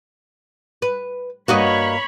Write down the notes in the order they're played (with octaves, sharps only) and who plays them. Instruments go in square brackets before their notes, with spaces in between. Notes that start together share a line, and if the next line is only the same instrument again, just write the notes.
[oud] B4
[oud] G2 F#4 D#5 [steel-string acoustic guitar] A#3 [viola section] C#5 B5